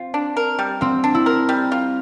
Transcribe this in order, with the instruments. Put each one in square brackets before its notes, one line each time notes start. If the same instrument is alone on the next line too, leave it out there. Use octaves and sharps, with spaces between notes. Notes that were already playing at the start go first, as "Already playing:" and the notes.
Already playing: [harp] C4 [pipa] F4
[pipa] D4
A#4
G3
[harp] C4 [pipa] F4
[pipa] D4
[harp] E4
[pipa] A#4
G3
F4